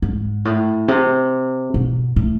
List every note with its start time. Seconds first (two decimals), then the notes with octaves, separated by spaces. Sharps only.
0.02 G#2
0.45 A2
0.88 C3
1.74 B2
2.16 A2